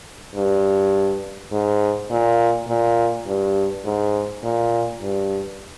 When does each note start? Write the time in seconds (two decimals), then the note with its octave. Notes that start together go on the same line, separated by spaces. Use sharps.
0.35 G2
1.52 G#2
2.10 A#2
2.68 A#2
3.27 G2
3.85 G#2
4.44 A#2
5.01 G2